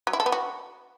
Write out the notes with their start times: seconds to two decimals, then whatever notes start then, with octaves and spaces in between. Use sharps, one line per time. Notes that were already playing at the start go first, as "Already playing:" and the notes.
0.07 F#3
0.13 E4
0.20 A4
0.26 B3
0.32 F#4